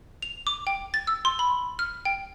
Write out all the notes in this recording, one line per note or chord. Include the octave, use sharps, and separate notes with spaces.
F7
D6
G5
A6
E6
C6
B5
F6
G5